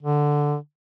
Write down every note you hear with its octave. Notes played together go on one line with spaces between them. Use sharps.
D3